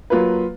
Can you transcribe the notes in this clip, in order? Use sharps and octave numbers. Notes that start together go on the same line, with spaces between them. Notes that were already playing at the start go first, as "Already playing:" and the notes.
F#3 A#3 F4 B4